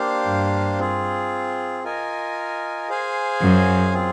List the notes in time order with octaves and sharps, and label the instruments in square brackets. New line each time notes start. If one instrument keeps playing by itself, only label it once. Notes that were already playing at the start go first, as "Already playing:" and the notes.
Already playing: [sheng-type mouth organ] A#3 D4 G4 C5 F5
[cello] G2
[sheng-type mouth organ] C4 F4 G#4
F4 A#4 D#5 G#5
G#4 C5 F5 G#5
[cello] F#2
[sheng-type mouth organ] C4 F4 G#4